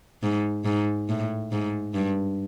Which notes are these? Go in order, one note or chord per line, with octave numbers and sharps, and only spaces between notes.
G#2
G#2
A2
G#2
G2